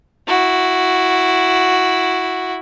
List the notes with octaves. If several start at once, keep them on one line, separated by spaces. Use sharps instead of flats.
E4 F#4